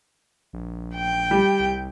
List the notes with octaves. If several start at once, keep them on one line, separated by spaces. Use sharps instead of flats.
A#1
G5
G3
C2